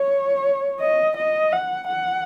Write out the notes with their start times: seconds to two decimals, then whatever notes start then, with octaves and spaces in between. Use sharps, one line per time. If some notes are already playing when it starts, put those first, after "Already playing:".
Already playing: C#5
0.81 D#5
1.17 D#5
1.53 F#5
1.88 F#5